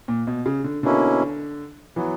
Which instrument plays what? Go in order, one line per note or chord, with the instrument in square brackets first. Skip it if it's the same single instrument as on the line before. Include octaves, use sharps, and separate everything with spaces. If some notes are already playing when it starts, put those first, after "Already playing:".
[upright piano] A#2
B2
C#3
D3
[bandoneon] B2 A#3 C#4 E4 [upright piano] D3
[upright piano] E3 [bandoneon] F#3 B3